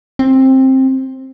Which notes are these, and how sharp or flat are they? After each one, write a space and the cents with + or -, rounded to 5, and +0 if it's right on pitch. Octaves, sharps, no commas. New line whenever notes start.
C4 +15